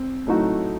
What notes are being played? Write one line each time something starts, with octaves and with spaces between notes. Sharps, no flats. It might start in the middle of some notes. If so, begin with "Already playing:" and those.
Already playing: C4
A2 F#3 A3 D#4 F#4